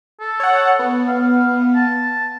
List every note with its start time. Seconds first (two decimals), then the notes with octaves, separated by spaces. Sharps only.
0.20 A4
0.40 C#5 F#5
0.79 B3
1.08 F5
1.76 A5